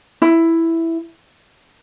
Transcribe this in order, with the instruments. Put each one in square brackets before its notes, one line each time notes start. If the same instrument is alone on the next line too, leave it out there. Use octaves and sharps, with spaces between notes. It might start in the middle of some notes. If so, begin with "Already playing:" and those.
[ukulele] E4